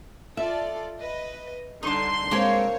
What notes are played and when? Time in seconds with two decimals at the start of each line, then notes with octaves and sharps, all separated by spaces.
0.37 F4 A4 D5 E5
0.99 B4 D#5
1.83 C2 D3 D4 D#4 C6
2.31 G#3 A#3 C4 G#4 C5 C#5